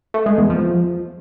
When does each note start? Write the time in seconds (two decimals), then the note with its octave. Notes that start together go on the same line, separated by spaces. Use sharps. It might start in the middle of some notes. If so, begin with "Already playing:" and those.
0.14 A3
0.26 G#3
0.38 E2
0.50 F3